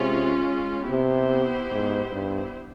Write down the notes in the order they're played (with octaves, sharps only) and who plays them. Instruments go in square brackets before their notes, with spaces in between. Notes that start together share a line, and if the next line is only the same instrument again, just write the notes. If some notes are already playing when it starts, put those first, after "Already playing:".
Already playing: [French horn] C3 [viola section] G#3 C#4 F4
[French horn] C3 [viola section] B3 E4 G4 C5
[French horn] G#2
G2